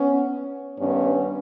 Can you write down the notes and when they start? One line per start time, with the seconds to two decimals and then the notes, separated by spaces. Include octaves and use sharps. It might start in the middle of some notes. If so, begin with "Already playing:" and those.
Already playing: B3 C#4
0.78 G2 D#3 B3 C#4